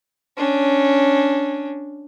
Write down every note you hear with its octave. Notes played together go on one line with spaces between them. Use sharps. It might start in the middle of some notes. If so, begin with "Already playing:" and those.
C#4 D4